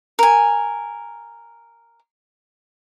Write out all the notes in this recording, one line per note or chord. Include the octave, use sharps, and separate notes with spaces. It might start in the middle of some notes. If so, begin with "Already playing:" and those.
A#4 G#5